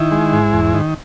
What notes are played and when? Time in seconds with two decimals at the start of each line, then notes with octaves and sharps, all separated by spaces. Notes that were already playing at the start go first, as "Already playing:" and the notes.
Already playing: D#3 E4
0.11 G#3
0.33 G#2
0.53 E2
0.74 D#3